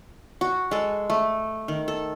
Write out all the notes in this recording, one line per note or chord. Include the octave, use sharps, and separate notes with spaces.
F#4
G#3 A4
A3
D#3
A4